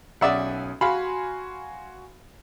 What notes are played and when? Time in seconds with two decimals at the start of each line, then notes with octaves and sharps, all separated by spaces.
0.21 B1 C#4 D5 E5 F#5 D#6
0.81 F#4 F5 G#5 B5 C6